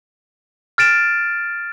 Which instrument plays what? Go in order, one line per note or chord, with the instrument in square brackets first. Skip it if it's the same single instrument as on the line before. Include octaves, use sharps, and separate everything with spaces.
[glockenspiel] F6 A6 D7 E7